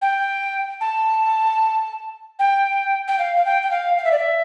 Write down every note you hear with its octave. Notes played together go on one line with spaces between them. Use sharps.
G5
A5
G5
G5
F5
F5
G5
G5
F5
F5
E5
D5
E5